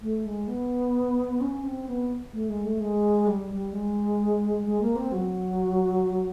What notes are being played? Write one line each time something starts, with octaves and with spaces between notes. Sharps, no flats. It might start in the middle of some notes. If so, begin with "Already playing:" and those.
A3
G#3
B3
C#4
C4
B3
A3
G#3
A3
G#3
G3
G3
G#3
G#3
A#3
C4
F#3